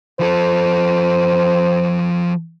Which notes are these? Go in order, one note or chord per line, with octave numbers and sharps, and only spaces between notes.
F3 A4 C5